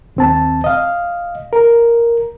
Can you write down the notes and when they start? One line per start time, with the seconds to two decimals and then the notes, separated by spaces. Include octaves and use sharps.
0.16 D#2 C4 A5
0.64 D#5 F5
1.53 A#4